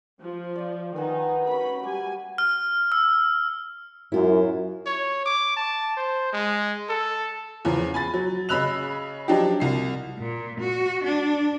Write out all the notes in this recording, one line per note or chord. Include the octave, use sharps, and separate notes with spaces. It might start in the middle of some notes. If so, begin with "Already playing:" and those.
F3
D5 F5
D#3 D#4 B4 F#5 G#5
C#4 F#4 A#4 B5
G3 G#5 D6
F6
E6
F#2 E4 F4
C#5
D6
A5
C5
G#3
A4
E2 C#3 F3
G#5 B5 A6
F#3
C#3 D#5 B5 E6 F#6 F7
F3 F#3 D4 D#4 G4
C2 C7
A#2
F#4
D4